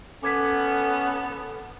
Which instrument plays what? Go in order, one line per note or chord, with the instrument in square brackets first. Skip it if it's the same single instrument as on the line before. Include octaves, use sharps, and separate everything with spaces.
[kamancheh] B3 [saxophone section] C#4 [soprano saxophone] A4 [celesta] D6 G#6 B6